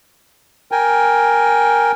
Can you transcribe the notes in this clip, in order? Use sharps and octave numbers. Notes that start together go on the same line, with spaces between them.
A#4 G5 G#5